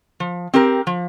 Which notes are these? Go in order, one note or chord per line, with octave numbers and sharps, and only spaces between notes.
F3
C4 G4 A#4
F3